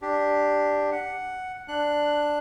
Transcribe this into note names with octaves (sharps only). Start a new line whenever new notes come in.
D4 G4
F#5
D4 F#6